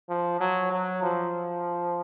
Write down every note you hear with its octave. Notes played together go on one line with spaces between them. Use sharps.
F3
F#3
F#3
F3